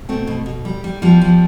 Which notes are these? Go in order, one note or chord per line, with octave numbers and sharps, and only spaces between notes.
B2 A3 C4
B2
B2
G3
G3
F3 G3 B3
F3